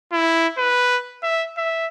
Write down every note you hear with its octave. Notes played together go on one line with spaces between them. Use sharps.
E4
B4
E5
E5